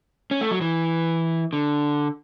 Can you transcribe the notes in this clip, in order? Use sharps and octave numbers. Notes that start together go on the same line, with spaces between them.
C#4
A3
F#3
E3
D3